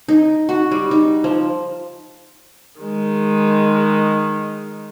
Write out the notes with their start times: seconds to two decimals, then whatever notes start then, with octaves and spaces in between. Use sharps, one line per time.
0.08 D#4
0.49 F#4
0.71 G3
0.91 D#4
1.24 F3
2.81 D#3 G#3